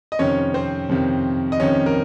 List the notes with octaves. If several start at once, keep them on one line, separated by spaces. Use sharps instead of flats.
D#5
F2 C3 D#3 C#4 C#5
C4 C5
F2 C3 D#3
D#5
F2 C3 D#3 C#4 C#5
A#4